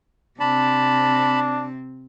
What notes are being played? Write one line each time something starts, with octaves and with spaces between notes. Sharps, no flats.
C3 C4 D4 A5 B5